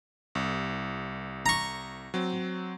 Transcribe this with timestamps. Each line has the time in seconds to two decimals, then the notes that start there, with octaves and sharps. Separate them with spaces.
0.35 C2
1.46 A#5 C#6
2.14 F#3 C4